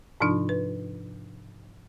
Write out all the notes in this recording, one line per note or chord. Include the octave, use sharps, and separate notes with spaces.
G#2 C3 F3 D4 D#4 F4
B4